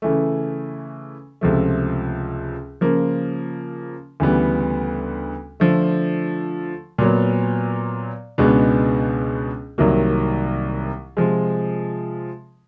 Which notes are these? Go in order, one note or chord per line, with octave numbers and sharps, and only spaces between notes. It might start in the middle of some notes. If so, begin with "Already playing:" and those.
C#3 E3 A3
C#2 C3 F3 A3
C#3 F3 A#3
D2 C#3 E3 G3 B3
D3 F3 A3
A#2 F#3 B3
C#2 B2 G#3 B3 D4
C2 C3 D#3 F#3 A#3
C3 F3 G#3